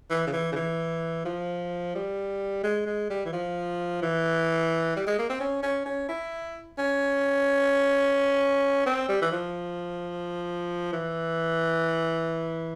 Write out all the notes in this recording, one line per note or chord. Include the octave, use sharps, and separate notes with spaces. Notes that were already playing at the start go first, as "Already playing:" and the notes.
E3
C#3
E3
C#3
E3
F3
G3
G#3
G#3
G3
E3
F3
E3
G3
G#3
A#3
C4
C#4
C#4
C#4
E4
C#4
C4
G3
E3
F3
E3